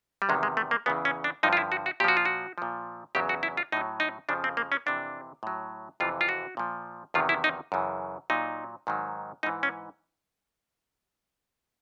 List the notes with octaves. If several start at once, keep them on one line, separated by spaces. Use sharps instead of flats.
G3
E2 C3 D#3 G#3
G#3
A3
A#3
E2 C#3 E3 B3
C#4
D4
G2 D3 F3 D#4
F4
E4
F#4
F#4
A#2 F3 F#4 G4
F4
F#4
A#2 F3
E2 C#3 F#3 G4
F#4
E4
F4
A2 F#3 D#4
D#4
F2 C#3 F3 D4
C4
A#3
C#4
F2 C3 E3 D4
A2 F#3
F2 C3 E3 F4
F4
F#4
A#2 F3
E2 C3 D#3 F#3 F4
E4
D#4
F#2 C#3 E3
A#2 F#3 D#4
G#2 D#3 F#3
G#2 E3 D#4
C#4